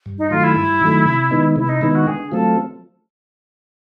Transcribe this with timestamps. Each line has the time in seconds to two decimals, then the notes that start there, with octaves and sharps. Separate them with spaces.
0.06 G2
0.18 D#4
0.30 D#3 F#3 A3 F4
0.43 E4
0.56 G2
0.81 D#3 F#3 A3
1.06 C3
1.31 D#3 G#3 B3 D#4
1.56 C3 E4
1.68 D#4
1.81 D#3 G#3 B3 D#4 E4
1.95 F#4
2.07 D3 G#4
2.32 F#3 A3 C4 F4 A4